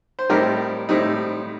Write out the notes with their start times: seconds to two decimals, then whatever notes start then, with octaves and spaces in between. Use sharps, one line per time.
0.19 C5
0.30 A2 G3 C4 D#4 G4 A#4
0.89 A2 G3 C4 D#4